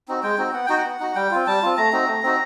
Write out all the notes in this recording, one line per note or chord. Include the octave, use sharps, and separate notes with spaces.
C4 D#4 F#4
G#3 G5
C4 D#4 F#4
B3 F#5
D#4 F#4 G5
F#5
B3
D#4 F#4
G3 G5
C4 F4
G3 A5
C4 F4
A3 A#5
C4 D#4 F#4
A3
C4 D#4 F#4